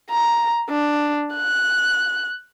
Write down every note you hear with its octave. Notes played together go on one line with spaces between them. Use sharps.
A#5
D4
F#6